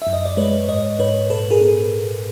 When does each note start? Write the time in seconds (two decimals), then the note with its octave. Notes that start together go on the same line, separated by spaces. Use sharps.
0.02 E5
0.07 F#2
0.13 D#5
0.25 D5
0.37 G#3 B4 C#5
0.68 G#2 C#5 D#5
0.99 G#2 B4 C#5
1.30 A#2 A4 B4
1.50 G#4 A#4
1.61 B3